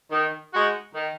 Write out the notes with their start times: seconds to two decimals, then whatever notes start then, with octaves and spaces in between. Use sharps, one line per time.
0.11 D#3
0.52 G#3 D#4 F#4
0.93 D#3